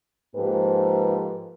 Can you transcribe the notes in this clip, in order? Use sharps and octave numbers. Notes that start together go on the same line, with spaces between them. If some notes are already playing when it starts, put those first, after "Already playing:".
G#2 F3 A#3 G4 A4 B4